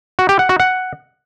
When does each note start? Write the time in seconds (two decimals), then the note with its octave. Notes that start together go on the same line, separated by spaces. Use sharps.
0.19 F#4
0.29 G4
0.39 F#5
0.49 F#4
0.60 F#5